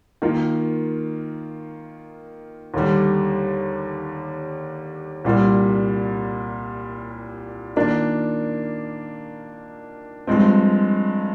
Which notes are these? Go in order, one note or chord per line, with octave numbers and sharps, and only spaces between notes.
D#3 A#3 F4
D#2 D3 G3
C2 A#2 G3 A#3
D#3 A#3 D4 F4
G2 F3 G#3 C4